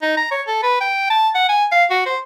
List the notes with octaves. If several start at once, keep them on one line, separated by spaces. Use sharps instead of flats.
D#4
A#5
C#5
A4
B4
G5
A5
F#5
G#5
F5
F#4
C5